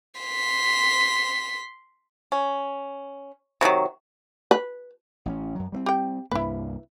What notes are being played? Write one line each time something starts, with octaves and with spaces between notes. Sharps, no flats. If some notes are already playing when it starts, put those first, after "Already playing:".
C6 B6
C#4
C3 D#3 F3 F#3
B4
A1 C4 C#4
F#2 F#3
G3 A#3 C4
G4 G5
C2 G2 A#3 E4 B4